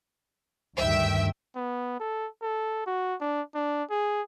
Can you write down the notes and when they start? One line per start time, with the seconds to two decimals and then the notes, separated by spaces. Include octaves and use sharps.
0.76 D2 G2 D#3 E5 G5
1.56 B3
1.99 A4
2.42 A4
2.86 F#4
3.21 D4
3.54 D4
3.90 G#4